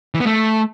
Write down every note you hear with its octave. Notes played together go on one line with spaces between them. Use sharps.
E3
B3
A3